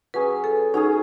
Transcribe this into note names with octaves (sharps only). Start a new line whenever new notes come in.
F#3 C#4 G#4 B4
A4
F#3 C#4 D#4 G#4